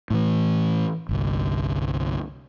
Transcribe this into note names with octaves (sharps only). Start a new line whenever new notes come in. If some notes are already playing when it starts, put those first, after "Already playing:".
A2 E3
G1 C2